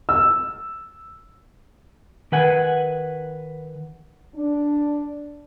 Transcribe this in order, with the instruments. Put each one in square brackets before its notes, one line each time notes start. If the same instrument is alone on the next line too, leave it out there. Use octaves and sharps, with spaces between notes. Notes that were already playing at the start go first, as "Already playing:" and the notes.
[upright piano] E6
[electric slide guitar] D#3 B4 F#5 G#5
[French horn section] D4